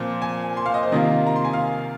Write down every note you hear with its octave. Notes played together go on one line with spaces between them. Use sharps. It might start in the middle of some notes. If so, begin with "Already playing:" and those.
Already playing: A#2 F3 C4
G#5
C6
F5
D#5
C5
C3 D#3 A#3 F4 D#5
A#5
C6
G#5
F5